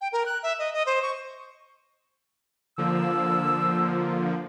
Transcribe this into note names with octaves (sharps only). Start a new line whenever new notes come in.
G5
A#4
F#6
E5
D#5
D#5
C5
C#6
D3 F3 A#3 E6